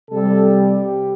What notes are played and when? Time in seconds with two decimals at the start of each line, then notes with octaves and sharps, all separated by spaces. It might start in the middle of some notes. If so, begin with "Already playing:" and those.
0.10 C3 G3 A4
0.53 G4